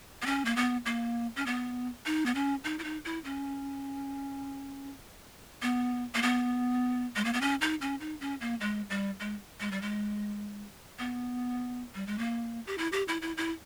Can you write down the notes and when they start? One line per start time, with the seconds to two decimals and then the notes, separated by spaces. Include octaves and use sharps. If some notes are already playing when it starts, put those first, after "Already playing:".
0.22 B3
0.26 C#4
0.45 A#3
0.56 B3
0.86 A#3
1.36 C#4
1.46 B3
2.06 D#4
2.26 B3
2.35 C#4
2.64 D#4
2.79 E4
2.84 D#4
3.05 E4
3.24 C#4
5.62 B3
6.15 A#3
6.22 B3
7.16 G#3
7.25 A#3
7.33 B3
7.41 C#4
7.61 D#4
7.81 C#4
8.00 D#4
8.21 C#4
8.41 A#3
8.61 G#3
8.90 G3
9.20 G#3
9.60 G#3
9.71 G3
9.82 G#3
10.99 B3
11.95 G3
12.07 G#3
12.18 A#3
12.67 G4
12.78 E4
12.92 G4
13.08 E4
13.22 E4
13.37 E4